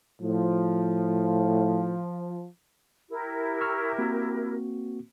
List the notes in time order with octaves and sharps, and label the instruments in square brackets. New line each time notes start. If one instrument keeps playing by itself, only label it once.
[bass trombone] A2 [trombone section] F3
[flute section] E4 G4 A#4
[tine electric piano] C#6 E6 F6
A#3 C4 F#4